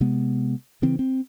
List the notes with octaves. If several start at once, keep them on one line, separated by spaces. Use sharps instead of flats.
C3 G#3 B3
C#3 E3 C4
C4